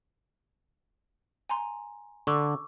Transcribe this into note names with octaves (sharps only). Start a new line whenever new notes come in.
G#5 A#5 C6
D3 C#6 D6 E6